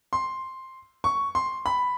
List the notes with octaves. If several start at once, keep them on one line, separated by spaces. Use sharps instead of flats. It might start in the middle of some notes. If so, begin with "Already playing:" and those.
C6
C#6
C6
B5